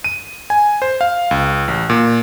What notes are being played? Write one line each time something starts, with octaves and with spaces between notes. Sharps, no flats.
D#7
G#5
C5
F5
C#2
A1
A#2